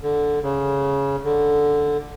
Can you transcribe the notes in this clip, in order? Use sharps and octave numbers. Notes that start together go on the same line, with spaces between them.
D3
C#3
D3